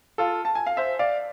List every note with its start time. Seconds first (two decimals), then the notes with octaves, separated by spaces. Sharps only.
0.18 F4 A4
0.45 A5
0.55 G#5
0.66 F5
0.77 C5 E5
0.99 D5 F5